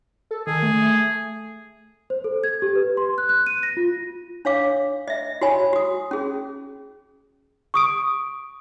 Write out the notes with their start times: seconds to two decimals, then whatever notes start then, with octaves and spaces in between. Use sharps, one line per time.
0.31 A4
0.47 D#3 G#4
0.63 A3
2.10 C5
2.24 A4
2.44 G#6
2.62 G4
2.76 B4
2.97 C6
3.18 F#6
3.29 F#6
3.47 D#7
3.63 A#6
3.77 F4
4.45 D4 C#5 F5 D6
5.08 D#5 E5
5.41 F#4 C#5 G#5 B5
5.73 F#4 D#6
6.11 C#4 G#4
7.74 C#6 D#6 D7